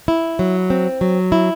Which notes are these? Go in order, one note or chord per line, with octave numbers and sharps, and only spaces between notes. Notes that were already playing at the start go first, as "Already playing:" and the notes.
E4
F#3
C4
F#3
E4